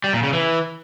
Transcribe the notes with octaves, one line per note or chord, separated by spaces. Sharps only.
G3
A#2
C#3
E3